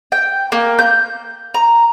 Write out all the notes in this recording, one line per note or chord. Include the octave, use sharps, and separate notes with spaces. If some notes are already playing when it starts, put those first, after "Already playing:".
G5
A#3
G6
A#5